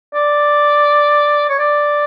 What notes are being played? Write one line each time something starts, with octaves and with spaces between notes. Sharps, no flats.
D5
C#5
D5